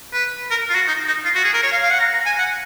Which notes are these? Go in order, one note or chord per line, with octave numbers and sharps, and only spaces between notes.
B4
A#4
F4
F#4
D#4
D#4
F4
F#4
G#4
A#4
C#5
F5
F5
F#5
A#5
A#5
G#5
F#5